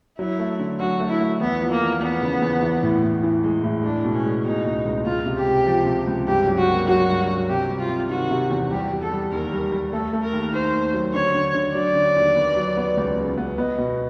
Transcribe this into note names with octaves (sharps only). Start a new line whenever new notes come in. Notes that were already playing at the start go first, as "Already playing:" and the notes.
F#3 E4
A3
D3
F#3 F#4
A3
E4
A3
E2 B3
F3
A#3
E2
E2 B3
C#3
E2
E3
A2
A2
E3
G#3
A2
G#3 D4
B2
C#4
G#3
B2 D#4
C#2
C#2
C#2 F4
C3
G4
C3
F3
C3
C#2
G2 G4
F#3
F#4
A#3
F#3 F#4
G2
F#3
C3 G4
G3
F4
C3
D#3 F#4
C3
E2
G3 G4
G3
A4
G3
D#2 A#4
G3
G3
A3 A4
A3
A#4
D#2
D#3 C5
D#2
F#3
D3 C#5
D3
D3
F#3 D5
D3
D#2
B3
F#3
B3
C#2
C#3
B3
B3 D#5
B2